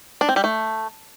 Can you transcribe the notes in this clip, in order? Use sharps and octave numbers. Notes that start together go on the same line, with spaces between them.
D4
C4
G3
A3